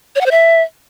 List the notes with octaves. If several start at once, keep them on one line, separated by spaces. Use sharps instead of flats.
C#5
F#5
C5
E5